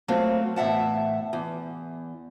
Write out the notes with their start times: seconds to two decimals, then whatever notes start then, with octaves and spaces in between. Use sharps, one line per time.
0.08 F#3 A3 A#3 C4 F4
0.56 E2 A2 E5 F#5 A5
1.33 E2